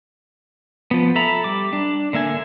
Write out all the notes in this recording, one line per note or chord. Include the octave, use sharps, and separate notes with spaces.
F3 B3
A4 E5 A#5 B5
G3 D6
D4
D3 A#3 E5 G#5